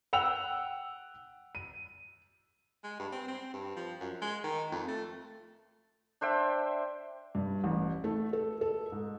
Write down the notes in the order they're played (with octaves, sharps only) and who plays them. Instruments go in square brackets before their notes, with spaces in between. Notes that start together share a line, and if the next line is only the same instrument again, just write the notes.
[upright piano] F#5 G5 E6 F7
D#7
[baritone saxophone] G#3
G2
C4
C4
G2
F3
F#2
G#3
D#3
F2
A3
[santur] D4 C5 E5 G5
[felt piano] G2
A1
A3
A4
A4
G#2